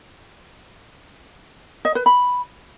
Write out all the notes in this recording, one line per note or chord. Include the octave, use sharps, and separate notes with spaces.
D#5
B4
B5